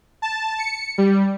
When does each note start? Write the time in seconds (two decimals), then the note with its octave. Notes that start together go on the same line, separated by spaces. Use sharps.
0.22 A5
0.58 C#7
0.98 G3